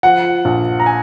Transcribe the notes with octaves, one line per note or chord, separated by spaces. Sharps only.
F3 F#5
A#1
A#5
G#5